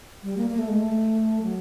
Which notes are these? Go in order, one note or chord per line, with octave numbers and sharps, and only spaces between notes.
G3
A#3
A#3
A3
G#3
A3
F#3